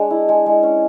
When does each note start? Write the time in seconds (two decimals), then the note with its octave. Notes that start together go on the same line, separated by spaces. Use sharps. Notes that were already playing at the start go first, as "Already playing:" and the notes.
Already playing: G#3 D4
0.10 E4
0.29 G#3
0.46 G#3
0.63 C#4